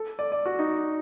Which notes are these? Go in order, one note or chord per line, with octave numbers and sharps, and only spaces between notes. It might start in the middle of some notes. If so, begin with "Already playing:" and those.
Already playing: A4
D5
D5
F#4
D#4